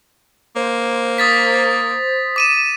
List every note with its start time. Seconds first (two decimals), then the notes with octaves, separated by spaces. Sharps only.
0.56 A#3 C5
1.18 D#6 A6 B6
2.36 D6 D#7 E7